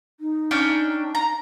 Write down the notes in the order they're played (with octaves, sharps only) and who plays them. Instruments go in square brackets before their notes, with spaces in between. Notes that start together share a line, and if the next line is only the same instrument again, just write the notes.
[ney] D#4
[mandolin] C#4 D4 G5
A#5